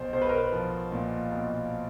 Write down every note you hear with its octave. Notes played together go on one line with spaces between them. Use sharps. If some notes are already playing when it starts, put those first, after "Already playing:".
Already playing: B1 C5
B1 C5
B4
A#4
B4
F3
A#2
B1